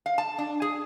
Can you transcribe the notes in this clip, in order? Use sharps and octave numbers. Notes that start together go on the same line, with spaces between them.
F5
A5
D4
G#4